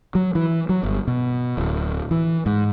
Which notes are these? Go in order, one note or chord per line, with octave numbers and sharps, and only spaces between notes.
F#3
E3
F#3
G1
B2
D1
E3
G#2